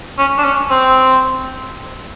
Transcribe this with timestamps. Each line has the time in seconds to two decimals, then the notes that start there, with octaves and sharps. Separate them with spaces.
0.18 C#4
0.38 D4
0.44 C#4
0.70 C4